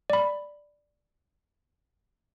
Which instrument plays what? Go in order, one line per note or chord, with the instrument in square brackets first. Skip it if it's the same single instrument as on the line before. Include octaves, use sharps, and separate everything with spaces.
[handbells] D5 B5